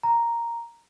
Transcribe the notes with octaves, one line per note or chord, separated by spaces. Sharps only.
A#5